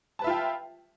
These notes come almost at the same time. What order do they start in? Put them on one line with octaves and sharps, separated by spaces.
A5 B4 E5 F4 G5